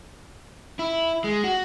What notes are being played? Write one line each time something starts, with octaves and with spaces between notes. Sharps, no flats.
E4
G#3
F#4